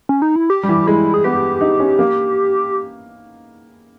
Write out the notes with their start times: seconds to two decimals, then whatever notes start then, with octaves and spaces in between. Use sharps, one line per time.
0.09 C#4
0.22 D#4
0.36 E4
0.50 G4
0.63 G3
0.69 E3
0.87 G#3 E4
1.14 G#4
1.24 B3 G4
1.61 D#4
1.80 C#4
1.99 A#3